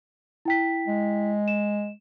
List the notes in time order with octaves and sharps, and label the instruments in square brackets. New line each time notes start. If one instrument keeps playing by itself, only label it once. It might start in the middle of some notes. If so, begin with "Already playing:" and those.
[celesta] E4 G5 B6
[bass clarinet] G#3
[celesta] E7